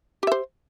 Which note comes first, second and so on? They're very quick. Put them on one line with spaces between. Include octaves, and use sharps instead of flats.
G4 E5 C5